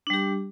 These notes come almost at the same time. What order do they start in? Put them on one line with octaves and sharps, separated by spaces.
D4 G3 G4